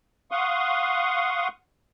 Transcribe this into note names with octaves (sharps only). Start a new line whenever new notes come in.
F5 F#5 C6 C#6 D#6